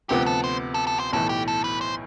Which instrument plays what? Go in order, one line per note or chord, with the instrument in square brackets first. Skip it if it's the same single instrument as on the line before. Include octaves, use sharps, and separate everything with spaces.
[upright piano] D2 C3 F3 B3 [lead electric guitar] G4
[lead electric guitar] A4
C5
A4
A4
C5
[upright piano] B1 A2 E3 [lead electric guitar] A4
[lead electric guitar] G4
A4
B4
C5